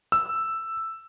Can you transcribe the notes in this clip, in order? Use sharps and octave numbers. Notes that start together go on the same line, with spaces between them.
E6